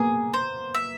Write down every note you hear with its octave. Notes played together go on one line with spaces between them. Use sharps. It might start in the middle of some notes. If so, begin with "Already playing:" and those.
Already playing: A#3 B3 G#4
C5
E5